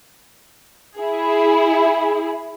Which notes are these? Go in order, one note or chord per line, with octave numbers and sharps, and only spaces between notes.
E4 G#4